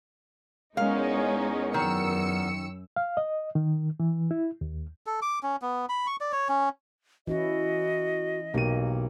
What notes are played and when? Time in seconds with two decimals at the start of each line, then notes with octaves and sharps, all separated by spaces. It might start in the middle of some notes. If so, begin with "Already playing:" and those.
0.77 E2 G#3 B3 C#4 D#4 A#4 F5
1.74 F#2 D#3 E6 C#7
2.96 F5
3.17 D#5
3.55 D#3
4.00 E3
4.31 E4
4.61 D#2
5.06 A4
5.22 D6
5.43 C#4
5.62 B3
5.89 B5
6.07 C#6
6.21 D5
6.32 C#5
6.49 C#4
7.27 E3 C#4 E4 F#4 D#5
8.54 B1 A#3 G4 D#7